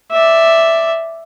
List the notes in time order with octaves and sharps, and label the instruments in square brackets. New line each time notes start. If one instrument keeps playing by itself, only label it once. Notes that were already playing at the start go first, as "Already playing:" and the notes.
[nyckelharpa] D5 E5